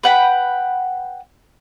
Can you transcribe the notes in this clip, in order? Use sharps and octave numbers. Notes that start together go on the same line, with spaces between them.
B4 F#5 G5